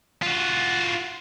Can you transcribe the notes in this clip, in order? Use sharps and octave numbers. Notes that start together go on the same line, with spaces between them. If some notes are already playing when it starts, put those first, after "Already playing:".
F4 F#4